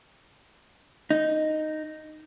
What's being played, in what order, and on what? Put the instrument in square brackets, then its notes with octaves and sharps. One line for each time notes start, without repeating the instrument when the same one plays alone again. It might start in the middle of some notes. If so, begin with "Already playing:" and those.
[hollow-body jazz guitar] D#4